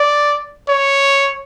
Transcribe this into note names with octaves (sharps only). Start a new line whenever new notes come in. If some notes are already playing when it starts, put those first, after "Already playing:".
Already playing: D5
C#5